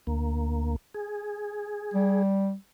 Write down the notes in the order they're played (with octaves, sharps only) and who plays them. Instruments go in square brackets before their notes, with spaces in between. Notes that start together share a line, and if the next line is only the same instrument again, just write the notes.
[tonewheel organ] D2 A#3
G#4
[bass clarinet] G3